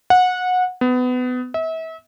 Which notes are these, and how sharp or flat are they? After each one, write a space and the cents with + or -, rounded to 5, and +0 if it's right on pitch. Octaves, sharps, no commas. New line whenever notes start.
F#5 -20
B3 +25
E5 -35